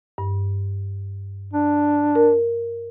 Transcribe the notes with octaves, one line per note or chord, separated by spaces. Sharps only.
G2
D4
A#4